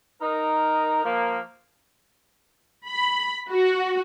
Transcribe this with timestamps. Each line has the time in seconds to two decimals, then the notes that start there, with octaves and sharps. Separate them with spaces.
0.20 D#4 A#4
1.04 F3 A#3
2.86 B5
3.49 F#4